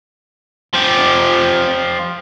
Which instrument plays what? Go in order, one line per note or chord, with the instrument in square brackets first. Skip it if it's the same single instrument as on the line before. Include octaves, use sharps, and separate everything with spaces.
[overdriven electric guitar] F3 G4